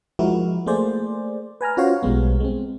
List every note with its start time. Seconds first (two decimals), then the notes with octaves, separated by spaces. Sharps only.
0.19 F3 G#3 E4 F#4 A#4
0.66 A3 A#3 G#4 C5 D5
1.61 B4 G#5 A#5 F6
1.77 C#4 F4 F#4 C5 C#5 F5
2.03 B1 G3 G#3 B3
2.40 G#3 C4